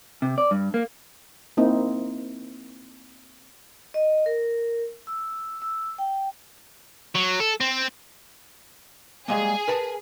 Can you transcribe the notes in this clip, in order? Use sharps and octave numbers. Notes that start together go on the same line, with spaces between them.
C3
D5
G2
A#3
A#3 C4 D#4 E4
D#5
A#4
E6
E6
G5
F#3
A4
C4
G3 G#3 A#3 G#4
A#4 B4 A5